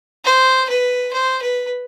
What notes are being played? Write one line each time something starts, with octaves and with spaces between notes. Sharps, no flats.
C5
B4
C5
B4